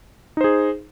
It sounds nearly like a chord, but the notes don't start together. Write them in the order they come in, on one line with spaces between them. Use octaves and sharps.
D#4 C5 G#4